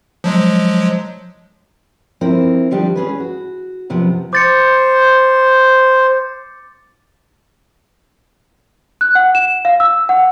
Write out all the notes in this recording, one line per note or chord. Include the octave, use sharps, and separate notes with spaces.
F3 F#3 G#3
F3 C4 E4 A#4
D#3 F3 G3 D4 G4
C#4 G#4 B4
F#4
F#2 C3 F3 B3
C5 D6 A6 C#7
F#6
F#5
E7
F5
E6
F#5